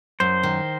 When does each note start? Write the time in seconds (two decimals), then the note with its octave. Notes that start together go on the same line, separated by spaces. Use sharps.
0.20 F#2 C5
0.43 D#3